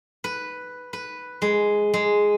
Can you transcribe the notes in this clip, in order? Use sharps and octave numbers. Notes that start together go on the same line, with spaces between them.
B4
B4
G#3
G#3